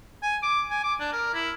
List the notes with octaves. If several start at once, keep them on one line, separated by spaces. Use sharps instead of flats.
G#5
D6
G#5
D6
D4
A#4
E4